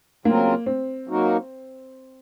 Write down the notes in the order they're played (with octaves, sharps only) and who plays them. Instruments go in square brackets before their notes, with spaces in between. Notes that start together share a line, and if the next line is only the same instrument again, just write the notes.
[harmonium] C#3 F#3 C4 F4 A#4 [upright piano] A#3
[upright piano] C4
[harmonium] F#3 A#3 D#4 F#4 A#4